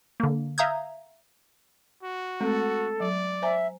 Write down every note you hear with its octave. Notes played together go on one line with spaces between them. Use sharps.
D3 A#3
E5 F5 A#5 D#6 G6 G#6
F#4
G#3 A3 C4 A4
F#3 D5
C5 E5 G#5 A#5